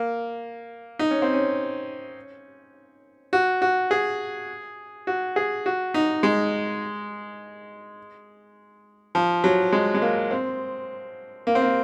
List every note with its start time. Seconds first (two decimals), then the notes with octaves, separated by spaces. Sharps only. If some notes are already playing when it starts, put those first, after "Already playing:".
Already playing: A#3
0.99 D#4
1.11 C#4
1.22 C4
1.33 C#4
3.33 F#4
3.62 F#4
3.91 G#4
5.07 F#4
5.36 G#4
5.66 F#4
5.94 D#4
6.23 G#3
9.15 F3
9.44 F#3
9.73 G#3
9.94 G#3
10.02 A#3
10.31 C4
11.47 A#3
11.55 C4
11.62 A#3